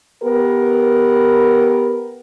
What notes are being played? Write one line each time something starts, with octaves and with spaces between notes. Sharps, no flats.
B3 G4 A#4 B4